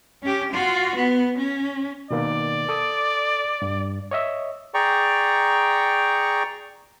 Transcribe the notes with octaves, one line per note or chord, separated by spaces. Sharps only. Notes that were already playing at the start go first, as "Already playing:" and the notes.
C#4 G4
F4 F#4
B3
C#4
B2 D#3 A#3 D5
A4 D6 D#6
G2
C#5 D#5 E5
G#4 D5 G5 A#5 C#6